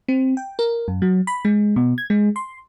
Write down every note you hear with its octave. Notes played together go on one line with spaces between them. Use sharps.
C4
G5
A#4
F#2
F#3
B5
G#3
B2
G#6
G#3
C6